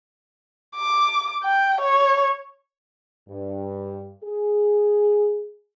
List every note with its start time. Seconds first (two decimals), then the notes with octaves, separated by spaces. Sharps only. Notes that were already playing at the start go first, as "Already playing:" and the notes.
0.76 D6
1.44 G5
1.81 C#5
3.29 G2
4.24 G#4